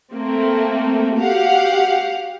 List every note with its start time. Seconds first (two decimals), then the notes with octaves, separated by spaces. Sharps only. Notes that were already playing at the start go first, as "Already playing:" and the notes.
0.12 A3 A#3 C4
1.18 F#4 G4 F5 F#5